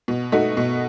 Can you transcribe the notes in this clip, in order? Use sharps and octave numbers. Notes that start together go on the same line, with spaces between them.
B2
A3 D#4 F#4
B2